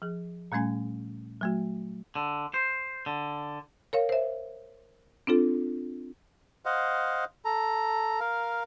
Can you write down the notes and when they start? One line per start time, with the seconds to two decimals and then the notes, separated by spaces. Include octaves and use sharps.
0.02 F3 G#4
0.52 A#2 G3 A3 C#4 G#5 G#6
1.41 F#3 A3 F#4
2.16 D3
2.54 C5
3.06 D3
3.93 A#4 C#5 F5
4.09 C5 E5
5.27 C4 D4 F4 A4
6.65 C5 D#5 F5 F#5
7.45 A4 A#5
8.20 A#4 F5